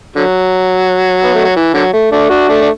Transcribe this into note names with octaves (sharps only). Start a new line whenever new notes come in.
D3 F#3
B3
A3
F#3
E3
D3 F#3
A3
A3 D4
D4 F#4
A3 D4
D4